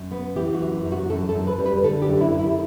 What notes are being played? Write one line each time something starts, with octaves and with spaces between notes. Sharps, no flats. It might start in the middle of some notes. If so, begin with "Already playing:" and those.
Already playing: F#2
B3
E3 G4
F#4
F#2
F#2
F#4
F#2 A4
A4
F#2
B4
G3
B4
D3 A4
G4
F#2
E4
F#2
E4